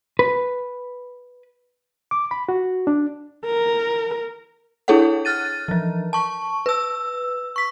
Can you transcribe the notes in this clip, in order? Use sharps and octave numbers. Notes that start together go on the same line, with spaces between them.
B4
D6
B5
F#4
D4
A#4
D4 E4 G#4 A4 C#5 F#5
F6 F#6 A6 D#7
E3 F3
A5 C#6
B4 E6
C#6 B6